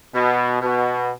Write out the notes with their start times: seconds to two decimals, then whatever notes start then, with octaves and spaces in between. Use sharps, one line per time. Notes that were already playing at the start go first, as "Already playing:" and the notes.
0.14 B2
0.61 B2